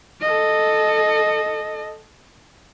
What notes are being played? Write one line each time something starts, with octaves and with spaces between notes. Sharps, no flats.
A4 D#5